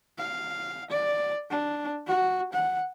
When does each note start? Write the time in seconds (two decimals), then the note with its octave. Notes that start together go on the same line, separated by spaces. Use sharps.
0.18 F5
0.91 D5
1.50 D4
2.07 F#4
2.53 F#5